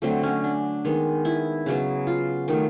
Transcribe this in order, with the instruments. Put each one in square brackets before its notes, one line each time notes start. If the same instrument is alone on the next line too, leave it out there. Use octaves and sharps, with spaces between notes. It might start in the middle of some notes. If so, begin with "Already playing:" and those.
[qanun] D3 F#3 A3 C4
C#4
D4
D#3 G#3 B3
E4
C#3 F#3 B3
F4
D#3 F#3 A3